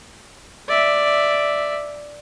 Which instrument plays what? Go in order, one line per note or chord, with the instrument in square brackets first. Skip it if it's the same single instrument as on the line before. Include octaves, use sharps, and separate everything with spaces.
[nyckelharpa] D5 E5